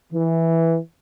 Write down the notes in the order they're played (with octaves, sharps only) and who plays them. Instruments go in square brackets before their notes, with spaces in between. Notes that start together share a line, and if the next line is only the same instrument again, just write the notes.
[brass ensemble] E3